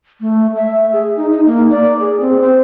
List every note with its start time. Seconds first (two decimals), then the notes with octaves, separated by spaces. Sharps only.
0.21 A3
0.56 E5
0.93 G#4
1.17 D#4
1.32 D#4
1.46 A#3
1.71 D5
2.00 G#4
2.21 C4
2.41 C5